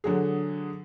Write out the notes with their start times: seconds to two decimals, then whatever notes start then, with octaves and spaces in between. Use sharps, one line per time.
0.04 D3 F#3 G#4